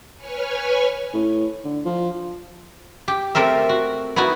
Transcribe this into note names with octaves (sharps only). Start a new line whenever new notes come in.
B4 C#5 G#5 C#6 F6
A2
D3
F3
G4
A3 C4 A#4 E5
F#4
B3 D#4 E4 F#4